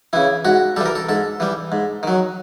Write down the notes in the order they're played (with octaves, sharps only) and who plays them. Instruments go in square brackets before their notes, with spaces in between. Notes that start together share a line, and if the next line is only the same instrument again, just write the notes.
[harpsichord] C#3 E3 E4
G#2 F#4
E3 G3 A4
A#4
A4
G#2 A4
E3 G3
G#2
D#3 F#3